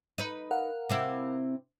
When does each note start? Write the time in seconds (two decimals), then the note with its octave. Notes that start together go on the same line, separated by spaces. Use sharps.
0.18 D#4 B4
0.51 A#4 F5 F#5
0.89 C3 C4 E4